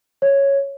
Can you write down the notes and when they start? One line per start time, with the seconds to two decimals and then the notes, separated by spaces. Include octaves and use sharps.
0.22 C#5